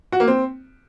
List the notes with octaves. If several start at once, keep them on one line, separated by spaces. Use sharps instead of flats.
F#4
A#3
C4